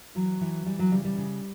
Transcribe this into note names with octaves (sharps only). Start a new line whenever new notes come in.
E3 F#3
E3
E3 G3
F#3
C#3 G3
G3
C#3